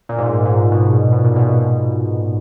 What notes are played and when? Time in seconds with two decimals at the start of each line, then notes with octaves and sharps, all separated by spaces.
0.09 A#2
0.19 G#2
0.45 G#2
0.72 B2
1.12 B2
1.24 A#2
1.36 B2